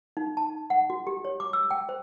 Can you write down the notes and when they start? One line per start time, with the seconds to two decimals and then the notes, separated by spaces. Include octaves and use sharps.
0.17 D#4
0.37 A5
0.50 D#4
0.70 F#5
0.90 F#4
1.07 G4
1.25 C#5
1.40 D6
1.53 E6
1.71 G5
1.89 C5